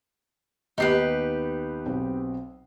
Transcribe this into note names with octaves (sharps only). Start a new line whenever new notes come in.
D#2 B3 D#4 G4 B4 C7
B1 C4